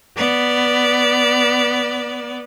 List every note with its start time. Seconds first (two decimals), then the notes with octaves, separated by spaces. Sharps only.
0.15 B3 D5